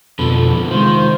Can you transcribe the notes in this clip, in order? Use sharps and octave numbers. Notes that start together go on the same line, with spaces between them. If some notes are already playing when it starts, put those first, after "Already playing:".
F2 B2 D3 F3 A4 B5
C3 D#3 G#3 F4 C5